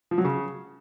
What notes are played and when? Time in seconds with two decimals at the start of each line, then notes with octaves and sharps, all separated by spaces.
0.11 F3
0.18 F#3
0.24 C#3